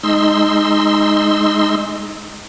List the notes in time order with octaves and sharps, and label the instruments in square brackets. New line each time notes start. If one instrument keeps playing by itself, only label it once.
[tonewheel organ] G#3 D#4 C6 E6